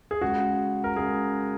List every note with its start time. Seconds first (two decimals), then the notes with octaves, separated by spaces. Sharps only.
0.11 G#4
0.21 C#3 G#3 F#4
0.84 A#4
0.95 C#3 G#3 G#4